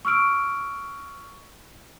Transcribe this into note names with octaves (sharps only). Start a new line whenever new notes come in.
C#6 E6 F6 D7